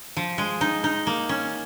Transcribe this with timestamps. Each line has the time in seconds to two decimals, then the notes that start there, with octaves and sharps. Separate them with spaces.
0.17 F3
0.38 G#3
0.61 D#4
0.84 D#4
1.07 A#3
1.29 C#4